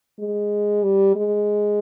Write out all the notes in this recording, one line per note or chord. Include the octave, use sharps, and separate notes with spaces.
G#3
G3
G#3